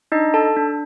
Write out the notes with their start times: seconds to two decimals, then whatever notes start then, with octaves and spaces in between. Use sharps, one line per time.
0.12 D4 D#4 D#5
0.34 A4 A5
0.56 D4